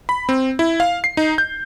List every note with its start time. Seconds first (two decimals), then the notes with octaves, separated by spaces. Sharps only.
0.09 B5
0.29 C4
0.59 E4
0.80 F5
1.04 C7
1.17 D#4
1.38 G6